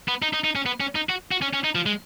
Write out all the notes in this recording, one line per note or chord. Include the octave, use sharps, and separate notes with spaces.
B3
D#4
D#4
D#4
C#4
B3
C#4
D#4
F#4
F#4
C#4
C#4
D#4
F3
G#3